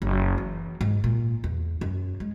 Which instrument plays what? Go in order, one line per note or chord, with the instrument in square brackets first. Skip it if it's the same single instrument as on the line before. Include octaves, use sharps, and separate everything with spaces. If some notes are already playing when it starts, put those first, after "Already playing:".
[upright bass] F#1
E3
G#2
A#2
E2
F#2
G#3